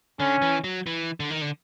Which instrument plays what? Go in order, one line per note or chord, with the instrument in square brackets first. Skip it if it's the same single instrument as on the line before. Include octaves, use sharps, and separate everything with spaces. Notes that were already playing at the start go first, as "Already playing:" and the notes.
[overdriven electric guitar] D3 [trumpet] C#4
[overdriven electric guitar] E3
F#3
E3
D3
D#3
D3